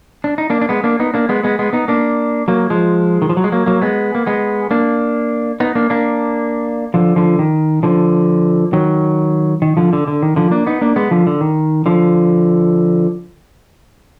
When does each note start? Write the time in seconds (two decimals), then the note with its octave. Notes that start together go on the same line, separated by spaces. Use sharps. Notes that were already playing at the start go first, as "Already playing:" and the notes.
0.24 D4
0.38 D#4
0.50 A#3 D4
0.62 D4
0.69 G#3 B3
0.84 A#3 D4
1.00 B3 D#4
1.14 A#3 D4
1.29 G#3 B3
1.43 G#3 B3
1.59 G#3 B3
1.73 B3 D#4
1.88 A#3 D4
2.48 F#3 A#3
2.70 F3 G#3
3.22 D#3
3.29 F3
3.37 F#3
3.44 G#3
3.52 F#3 A#3
3.66 F#3 A#3
3.82 G#3 B3
4.15 A#3
4.27 G#3 B3
4.71 A#3 D4
5.60 B3 D#4
5.75 A#3 D4
5.90 A#3 D4
6.94 D3 F3
7.16 D3 F3
7.39 D#3
7.83 D3 F3
8.73 D#3 F#3
9.62 D#3
9.77 D3 F3
9.93 D3
10.08 D3
10.23 D#3
10.36 D3 F3
10.51 A#3 D4
10.66 B3 D#4
10.81 A#3 D4
10.96 G#3 B3
11.11 D3 F3
11.27 D3
11.41 D#3
11.86 D3 F3